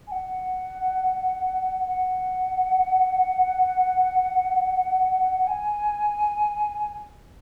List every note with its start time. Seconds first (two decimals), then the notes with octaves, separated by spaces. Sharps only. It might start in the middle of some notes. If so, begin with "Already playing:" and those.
0.07 G#5
0.12 F#5
1.87 F#5
5.47 G#5